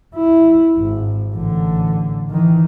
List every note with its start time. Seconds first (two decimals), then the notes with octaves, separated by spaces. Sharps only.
0.15 E4
0.77 G#1
1.35 A1 D3
2.30 D#3 E3